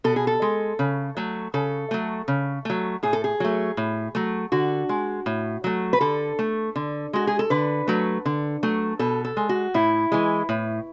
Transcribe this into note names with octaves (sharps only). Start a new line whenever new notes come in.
B2 A4
G#4
A4
G#3
C#3
F#3 A3
C#3 A4
F#3 A3
C#3
F#3 A3
A2 G#4
A4
G#4
F#3 A3
A2
F#3 A3
D3 F#4
G#3
A2
F#3 A3
B4
D3 A4
A3
D3
G#3 F#4
G#4
A4
D3 B4
F#3 A3
D3
F#3 A3
B2 A4
A4
G#3
F#4
A2 E4
E3 G#3
A2